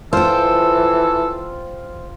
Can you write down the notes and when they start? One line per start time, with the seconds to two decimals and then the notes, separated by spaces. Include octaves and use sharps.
0.13 E3 F4 A4 C5 G5